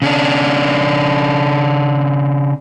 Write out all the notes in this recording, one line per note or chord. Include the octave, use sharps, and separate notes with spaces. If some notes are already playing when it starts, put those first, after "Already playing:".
C#3 C#4 D4